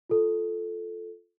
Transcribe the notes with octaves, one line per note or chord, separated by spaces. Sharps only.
F4 A4